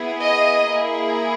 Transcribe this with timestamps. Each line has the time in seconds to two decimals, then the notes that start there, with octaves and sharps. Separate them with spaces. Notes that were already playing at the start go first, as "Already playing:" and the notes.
Already playing: B3 E4 G#4
0.24 D#5
0.68 A#3 E4 G#4